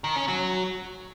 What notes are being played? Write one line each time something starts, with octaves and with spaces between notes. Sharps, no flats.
D#3
C#4
F#3